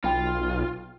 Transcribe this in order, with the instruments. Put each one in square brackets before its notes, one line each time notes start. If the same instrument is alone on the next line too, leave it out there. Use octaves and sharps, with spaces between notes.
[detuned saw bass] B1 [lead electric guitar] F4 [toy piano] G5 B5